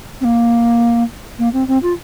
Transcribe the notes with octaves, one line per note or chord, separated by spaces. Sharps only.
C4
A#3
A#3
C4
C4
F4